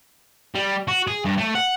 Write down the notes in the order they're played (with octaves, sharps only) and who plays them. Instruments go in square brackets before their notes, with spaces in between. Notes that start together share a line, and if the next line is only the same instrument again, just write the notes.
[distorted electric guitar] G3
F#4
G#4
G2
A3
F#5